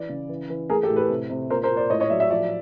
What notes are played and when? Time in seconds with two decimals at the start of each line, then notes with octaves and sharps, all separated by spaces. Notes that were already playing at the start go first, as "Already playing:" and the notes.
Already playing: E3 D5
0.09 C#3
0.29 E3
0.50 E3
0.69 A3 G#4 A#4
0.83 G4 A4
0.90 A2
0.96 A4 B4
1.10 C3
1.30 C3
1.50 A#2 A#4 C5
1.63 A#4 C5
1.70 A#2
1.76 C5 D5
1.90 A2 C#5 D#5
2.00 C#5 D#5
2.10 F#3 D5 E5
2.20 D5 E5
2.30 F3 D5 E5